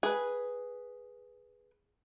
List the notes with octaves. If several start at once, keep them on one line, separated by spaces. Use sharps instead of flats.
G#4 B4